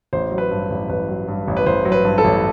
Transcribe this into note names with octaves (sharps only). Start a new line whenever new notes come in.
A1 C5
F#3
B4
G2
A1
A1 B4
F#3
G2
A1
B4
A1 C5
F#3
B4
G2
A4
A1